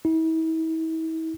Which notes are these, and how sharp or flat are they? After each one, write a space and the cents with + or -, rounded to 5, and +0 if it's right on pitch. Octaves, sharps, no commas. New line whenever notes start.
E4 -40